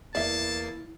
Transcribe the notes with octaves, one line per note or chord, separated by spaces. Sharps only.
E2 A#3 E4 D5 E5 A5 C7